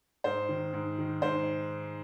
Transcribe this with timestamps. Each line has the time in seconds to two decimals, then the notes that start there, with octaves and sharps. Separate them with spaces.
0.24 G#2 C5
0.49 D#3
0.73 G#2
0.98 D#3
1.22 G#2 C5